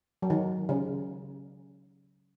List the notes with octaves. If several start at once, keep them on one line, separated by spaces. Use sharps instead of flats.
F#3
D#3
C#3